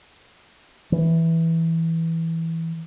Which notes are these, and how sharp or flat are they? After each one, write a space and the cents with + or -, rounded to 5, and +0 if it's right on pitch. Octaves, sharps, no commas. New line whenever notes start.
E3 -5